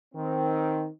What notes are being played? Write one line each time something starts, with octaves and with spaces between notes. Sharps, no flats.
D#3 C4